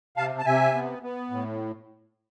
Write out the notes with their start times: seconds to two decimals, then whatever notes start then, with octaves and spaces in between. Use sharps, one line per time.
0.17 C3 F5 A5
0.39 A5
0.45 C3 E5 G#5
0.74 B3
1.03 B3
1.31 A2